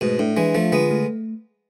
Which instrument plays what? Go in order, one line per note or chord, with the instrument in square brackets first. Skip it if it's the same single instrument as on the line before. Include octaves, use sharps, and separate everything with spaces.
[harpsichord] G#2 B2 [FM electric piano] A3
[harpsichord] A2 [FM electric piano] D4
[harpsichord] E3 G#3 [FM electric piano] D4
[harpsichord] F3 A3 [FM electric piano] F4
[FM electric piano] D3 [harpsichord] G#3 B3
[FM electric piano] A3